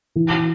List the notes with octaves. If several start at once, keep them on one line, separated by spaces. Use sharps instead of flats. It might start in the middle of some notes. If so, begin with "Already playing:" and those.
E3